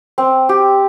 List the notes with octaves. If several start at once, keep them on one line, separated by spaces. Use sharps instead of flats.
C4
G4